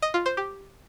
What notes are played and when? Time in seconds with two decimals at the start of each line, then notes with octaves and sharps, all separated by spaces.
0.02 D#5
0.14 F4
0.26 C5
0.37 G4